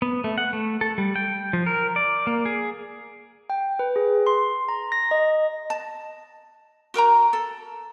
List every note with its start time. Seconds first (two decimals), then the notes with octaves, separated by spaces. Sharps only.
0.02 B3
0.24 A3
0.38 F#5
0.53 A3
0.81 A4
0.98 G3
1.16 G5
1.53 F3
1.66 A#4
1.96 D5
2.27 A#3
2.46 G#4
3.50 G5
3.79 B4
3.96 G#4
4.27 C6
4.69 A#5
4.92 A#6
5.11 D#5
5.70 A5
6.94 F#4 A#4 G5 A#5
7.33 A4